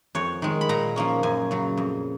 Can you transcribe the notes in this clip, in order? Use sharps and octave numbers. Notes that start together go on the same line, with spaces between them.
F2 C#5
D#3 G#3
B5
A#2 A#5
F3 A#3 C#4
F#2 G#5
C#3 F#3
F2